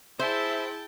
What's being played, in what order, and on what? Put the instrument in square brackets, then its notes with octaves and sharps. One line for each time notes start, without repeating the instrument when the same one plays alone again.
[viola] E4 G#4 [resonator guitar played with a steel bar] C5 [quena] E5 [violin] G5 A5